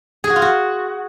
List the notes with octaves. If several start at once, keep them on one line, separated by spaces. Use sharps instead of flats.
G#4
F#4
F4
F#4